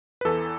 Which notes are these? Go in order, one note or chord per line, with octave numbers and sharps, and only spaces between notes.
B4
E2 E3 A4